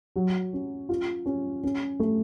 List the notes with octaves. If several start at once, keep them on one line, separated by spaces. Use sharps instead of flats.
F#3
C#4
F4
C#4
C#4
A3